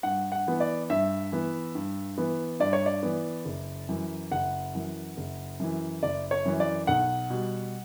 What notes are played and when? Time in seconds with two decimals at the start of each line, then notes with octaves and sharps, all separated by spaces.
0.03 G2 F#5
0.32 F#5
0.47 E3 B3
0.60 D5
0.89 G2 E5
1.32 E3 B3
1.75 G2
2.18 E3 B3
2.60 G2 D5
2.73 C#5
2.86 D5
3.03 E3 B3
3.45 F#1
3.88 F#2 E3
4.31 F#1 F#5
4.75 F#2 E3
5.17 F#1
5.60 F#2 E3
6.03 F#1 D5
6.31 C#5
6.45 F#2 E3
6.60 D5
6.87 B1 F#5
7.30 B2 G3